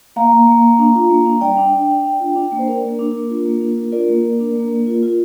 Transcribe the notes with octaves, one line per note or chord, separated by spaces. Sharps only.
A#3 F5 A#5
A#3
A#3
A#3
D4
F4
A#3
D4
G3 D5 G5
D4
D4
D4
D4
F4
D4
A#3
C5
D4 A#4
A#3
D4
A#3
F4
A#3
D4
F4
F4 A#4 D5
A#3
A#3
D4
A#3
A#3
F4
F4